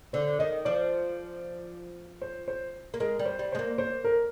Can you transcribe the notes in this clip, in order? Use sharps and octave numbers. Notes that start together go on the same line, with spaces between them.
D3 C5
D#3 D#5
F3 D5
C5
C5
A#3
G#3 A#4
G3
C5
G3
G#3 C5
A#3
C5
A#4